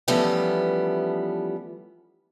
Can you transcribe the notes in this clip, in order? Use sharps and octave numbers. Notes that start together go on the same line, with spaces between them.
E3 F3 G3 A3 B3 C#4